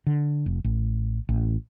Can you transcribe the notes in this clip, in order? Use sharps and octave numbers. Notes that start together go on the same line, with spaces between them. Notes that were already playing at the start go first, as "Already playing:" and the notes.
D3
F1
A1
A1